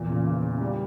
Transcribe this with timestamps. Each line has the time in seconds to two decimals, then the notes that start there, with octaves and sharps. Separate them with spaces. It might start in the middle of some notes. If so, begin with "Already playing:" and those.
Already playing: E2 A#2
0.10 C#3
0.27 C#3
0.43 C#3
0.61 G3